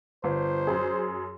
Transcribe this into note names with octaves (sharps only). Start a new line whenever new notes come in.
G1 C5
F#2 G#4